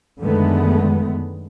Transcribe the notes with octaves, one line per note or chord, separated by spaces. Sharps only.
F#2 D3 D#3 G#3 A3 B3